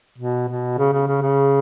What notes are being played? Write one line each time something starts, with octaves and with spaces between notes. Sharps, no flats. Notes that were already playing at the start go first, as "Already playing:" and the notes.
B2
B2
C#3
C#3
C#3
C#3